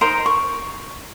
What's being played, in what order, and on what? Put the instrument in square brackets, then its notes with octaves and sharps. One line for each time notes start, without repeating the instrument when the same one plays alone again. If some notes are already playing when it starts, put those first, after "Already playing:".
[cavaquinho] D#4 A#4 C5 C6
C#6